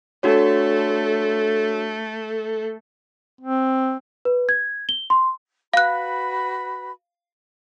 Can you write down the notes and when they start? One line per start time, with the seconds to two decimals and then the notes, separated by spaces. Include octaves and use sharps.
0.23 A3 D4 F#4 A4 C#5
3.41 C4
4.25 B4
4.49 G#6
4.89 G7
5.10 C6
5.74 F#4 B4 F5 B5 F#6